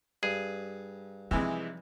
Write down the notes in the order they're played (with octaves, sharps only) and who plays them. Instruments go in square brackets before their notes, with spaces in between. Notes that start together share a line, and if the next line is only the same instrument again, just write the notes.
[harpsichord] G2 [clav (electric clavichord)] G#4
[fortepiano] C3 E3 G#3 [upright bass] F3 D#4